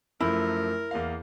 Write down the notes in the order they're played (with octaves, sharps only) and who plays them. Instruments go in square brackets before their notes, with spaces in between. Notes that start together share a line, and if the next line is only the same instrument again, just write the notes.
[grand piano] F#2 F3 A3 [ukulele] E4 [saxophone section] A#4
[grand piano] E2 A#3 F5